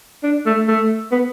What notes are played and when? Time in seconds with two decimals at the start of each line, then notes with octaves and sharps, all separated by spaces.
0.23 D4
0.46 A3
0.68 A3
1.12 B3